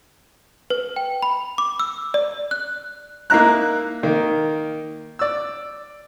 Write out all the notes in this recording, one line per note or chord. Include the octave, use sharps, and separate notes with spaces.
B4
G5
B5
D6
E6
D5
F#6
A#3 D#4 E4 A#5 F#6
D#3 A#3
D5 E6